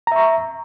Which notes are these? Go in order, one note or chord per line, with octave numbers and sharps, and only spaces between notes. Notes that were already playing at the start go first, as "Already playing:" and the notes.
E5 A#5 C#6